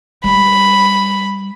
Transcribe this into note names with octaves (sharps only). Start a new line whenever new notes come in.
G3 B5